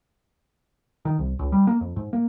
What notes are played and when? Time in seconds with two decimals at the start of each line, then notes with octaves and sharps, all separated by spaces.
1.05 D#3
1.19 C2
1.39 C#2
1.52 G3
1.67 A#3
1.81 F2
1.96 G#2
2.13 A#3